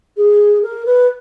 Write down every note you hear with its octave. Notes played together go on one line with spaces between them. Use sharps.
G#4
A#4
B4